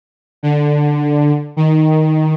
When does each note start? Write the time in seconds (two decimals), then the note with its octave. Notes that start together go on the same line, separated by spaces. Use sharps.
0.43 D3
1.57 D#3